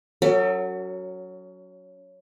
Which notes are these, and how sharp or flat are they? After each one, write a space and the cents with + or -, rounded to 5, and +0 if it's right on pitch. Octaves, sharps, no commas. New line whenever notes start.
F#3 +0 C#4 +25 A4 +45